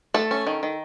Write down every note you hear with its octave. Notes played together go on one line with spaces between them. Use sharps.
A3 A4
C#4
D#3
D#3